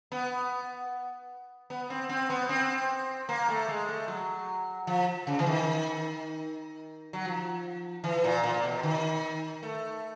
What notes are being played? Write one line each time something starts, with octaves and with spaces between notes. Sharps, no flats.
B3
B3
C4
C4
B3
C4
A#3
A3
G#3
A3
F#3
F3
C#3
E3
D#3
F#3
F3
E3
A#2
A#2
A#2
B2
D#3
A3